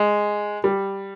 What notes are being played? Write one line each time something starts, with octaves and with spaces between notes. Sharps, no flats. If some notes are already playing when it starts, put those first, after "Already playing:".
Already playing: G#3
G3